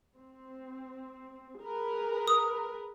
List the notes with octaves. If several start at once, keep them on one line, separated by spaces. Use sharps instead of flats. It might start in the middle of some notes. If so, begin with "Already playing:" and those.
C4
G#4 A#4 B4
D#6